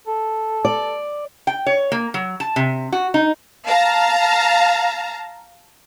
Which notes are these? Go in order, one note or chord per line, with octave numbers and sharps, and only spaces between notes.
A4
D5
G5
C#5
A#3
F#3
A5
C3
F#4
D#4
F5 A5 A#5